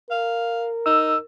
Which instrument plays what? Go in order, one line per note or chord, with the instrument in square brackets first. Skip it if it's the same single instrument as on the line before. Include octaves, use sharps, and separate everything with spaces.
[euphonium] A#4 [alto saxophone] F5
[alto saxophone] D#4 [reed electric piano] E6